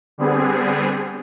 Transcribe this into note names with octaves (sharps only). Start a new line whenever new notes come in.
D3 G3 B3 C4 G#4